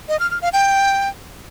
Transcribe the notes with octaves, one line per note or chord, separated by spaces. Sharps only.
D#5
F6
F6
F5
G5